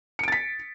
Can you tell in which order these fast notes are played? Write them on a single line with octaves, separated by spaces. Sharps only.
C#7 D7 A6 B6